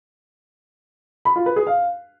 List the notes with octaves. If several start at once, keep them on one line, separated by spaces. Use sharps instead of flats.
B5
F4
B4
G#4
F5